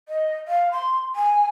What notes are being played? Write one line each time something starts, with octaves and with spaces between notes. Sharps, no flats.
D#5
F5
C6
G#5